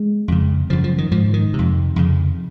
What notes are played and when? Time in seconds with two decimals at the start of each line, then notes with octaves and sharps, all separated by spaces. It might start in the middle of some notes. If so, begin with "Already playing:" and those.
Already playing: G#3
0.28 F2 C#3
0.70 F#2 C#3 F3
0.84 F3
0.98 D#3
1.11 G#2 F3
1.34 D#3
1.54 C3
1.59 F2
1.96 F2 C#3